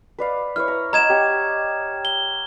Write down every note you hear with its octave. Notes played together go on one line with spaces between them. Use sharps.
B4 D5 F5
E4 B4 C#5 F6
A#5
D#5 F#5 A#5 G#6 E7
G4 C#5 F#5
G7